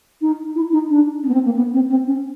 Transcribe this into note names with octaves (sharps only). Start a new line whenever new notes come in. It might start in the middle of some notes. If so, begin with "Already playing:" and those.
D#4
E4
D#4
D4
C#4
B3
C4
A#3
B3
C4
C4
C#4